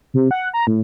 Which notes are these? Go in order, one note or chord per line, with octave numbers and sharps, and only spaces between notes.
C3
F#5
A#5
A2